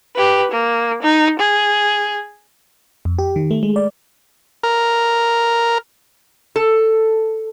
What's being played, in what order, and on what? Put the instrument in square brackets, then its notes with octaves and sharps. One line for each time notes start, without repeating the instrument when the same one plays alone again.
[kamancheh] G4 B4
A#3
D#4
G#4
[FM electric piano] F2
G4
D#3
A3
G#3
D5
[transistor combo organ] A#4
[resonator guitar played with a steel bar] A4